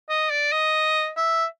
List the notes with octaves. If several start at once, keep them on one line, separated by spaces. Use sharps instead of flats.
D#5
D5
D#5
E5